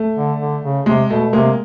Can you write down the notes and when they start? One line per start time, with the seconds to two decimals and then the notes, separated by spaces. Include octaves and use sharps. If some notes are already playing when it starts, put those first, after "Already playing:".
Already playing: A3
0.16 D3
0.40 D3
0.64 C#3
0.86 C3 G#3
1.10 B2 A3
1.33 C3 G#3 A#3